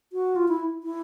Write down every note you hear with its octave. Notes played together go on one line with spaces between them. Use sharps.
F#4
F4
E4
E4